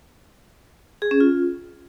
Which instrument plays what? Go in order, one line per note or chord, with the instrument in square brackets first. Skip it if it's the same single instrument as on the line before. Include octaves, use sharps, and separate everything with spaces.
[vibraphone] G#4
C#4
F4